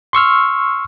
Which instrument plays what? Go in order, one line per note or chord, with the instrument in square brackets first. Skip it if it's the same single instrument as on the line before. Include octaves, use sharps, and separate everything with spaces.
[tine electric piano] C6 C#6 E6 F6